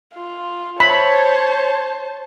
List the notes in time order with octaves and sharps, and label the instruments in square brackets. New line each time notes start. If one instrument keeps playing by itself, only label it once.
[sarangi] F4
[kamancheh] C5 A5 [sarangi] C#5 [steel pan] B5